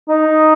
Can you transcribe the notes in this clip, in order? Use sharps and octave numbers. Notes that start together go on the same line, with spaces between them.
D#4